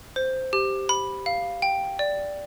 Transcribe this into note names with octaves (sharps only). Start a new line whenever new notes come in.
C5
G4
B5
F5
G5
D5